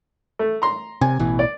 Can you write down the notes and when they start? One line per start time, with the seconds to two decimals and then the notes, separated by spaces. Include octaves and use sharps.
0.39 A3
0.62 A#5 C6
1.01 C3 G#5
1.19 A1 B2 E3
1.39 D5